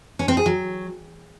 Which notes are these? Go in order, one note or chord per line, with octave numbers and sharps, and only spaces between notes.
C#4
C4
G#4
F#3